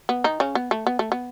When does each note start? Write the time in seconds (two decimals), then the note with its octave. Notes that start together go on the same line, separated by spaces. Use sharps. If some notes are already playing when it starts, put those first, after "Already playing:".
0.09 B3
0.24 D#3 D#4
0.40 C#3 C#4
0.55 B3
0.71 A3
0.87 B3
0.99 A3
1.12 B3